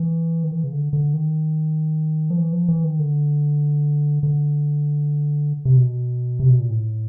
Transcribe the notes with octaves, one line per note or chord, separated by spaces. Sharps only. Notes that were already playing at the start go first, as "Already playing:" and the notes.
Already playing: E3
D#3
E3
C#3
D3
D3
D#3
F3
E3
F3
E3
D#3
D3
D3
C3
B2
C3
B2
A#2
A2